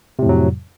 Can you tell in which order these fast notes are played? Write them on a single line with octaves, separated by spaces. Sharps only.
C3 A2 F2 F#3